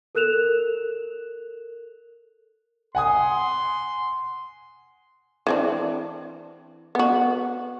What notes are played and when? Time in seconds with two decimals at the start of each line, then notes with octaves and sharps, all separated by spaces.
0.15 A4 A#4 F#6 E7 F7
2.95 F#5 G#5 C6 D#6
5.47 E3 C4 D4
6.95 B3 F#4